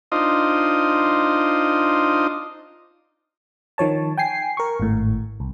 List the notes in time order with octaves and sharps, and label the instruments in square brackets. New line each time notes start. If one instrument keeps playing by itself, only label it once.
[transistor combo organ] D4 D#4 F4 C5 D#5
[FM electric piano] D#3 F3 C#5 A5
G5 G#5 C7
A#4 C#6
G#1 A2
C2